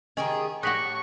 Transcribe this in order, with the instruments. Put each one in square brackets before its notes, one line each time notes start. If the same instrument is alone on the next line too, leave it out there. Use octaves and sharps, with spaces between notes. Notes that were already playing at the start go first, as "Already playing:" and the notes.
[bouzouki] D#3 G4 G#4 [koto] C#4 [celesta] D#5 A#5
[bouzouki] A2 [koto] F#4 G4 D#5 [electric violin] C#6 [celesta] F#6 B6 F#7